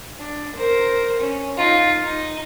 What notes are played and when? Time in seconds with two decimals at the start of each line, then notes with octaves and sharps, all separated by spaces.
0.19 D4
0.56 A#4 C5
1.20 C#4
1.57 D#4 F4
2.04 D#4